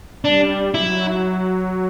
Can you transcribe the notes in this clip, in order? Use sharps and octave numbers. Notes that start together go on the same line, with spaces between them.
G3 D4
F#3 E4